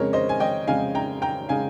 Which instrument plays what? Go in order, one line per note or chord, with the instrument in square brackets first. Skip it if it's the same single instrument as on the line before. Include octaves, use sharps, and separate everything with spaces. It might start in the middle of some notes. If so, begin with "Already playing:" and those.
Already playing: [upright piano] F2 C#3 G#3 A#4 C#5
C5 D#5
G#5
D#5 G5
F2 C#3 G#3 F5 G#5
G5 A#5
G5 A#5
C#3 G#3 F5 G#5